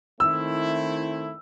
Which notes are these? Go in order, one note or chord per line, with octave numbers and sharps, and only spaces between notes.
D#3 A3 C4 E4 E6